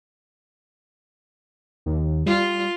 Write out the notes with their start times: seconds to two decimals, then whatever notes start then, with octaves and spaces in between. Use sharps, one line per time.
1.86 D#2
2.26 G3 F4